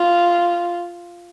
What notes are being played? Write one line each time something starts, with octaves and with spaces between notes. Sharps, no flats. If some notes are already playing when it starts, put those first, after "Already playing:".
Already playing: F4